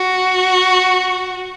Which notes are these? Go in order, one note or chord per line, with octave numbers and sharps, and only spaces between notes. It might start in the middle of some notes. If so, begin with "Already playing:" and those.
Already playing: F#4